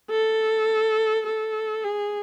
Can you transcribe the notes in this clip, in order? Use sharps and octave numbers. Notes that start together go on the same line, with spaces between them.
A4
A4
G#4